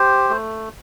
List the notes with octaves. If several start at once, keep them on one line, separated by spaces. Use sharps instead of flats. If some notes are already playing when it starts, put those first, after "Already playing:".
Already playing: G4 C5
A3